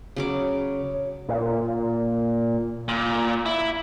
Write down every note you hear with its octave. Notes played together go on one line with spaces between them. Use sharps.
C#3 F#3 D6
A#2
A#2
E4